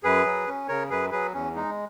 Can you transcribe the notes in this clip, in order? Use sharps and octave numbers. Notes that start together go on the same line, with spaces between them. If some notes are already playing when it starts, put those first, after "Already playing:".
F#2 G#4 B4
F#3
C#4
C#3 A#4 C#5
F#2 G#4 B4
F#3 G#4 B4
E2 C#4
G#3 D#4